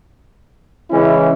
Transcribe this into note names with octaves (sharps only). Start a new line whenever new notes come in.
C#3 E3 G#3 C#4 E4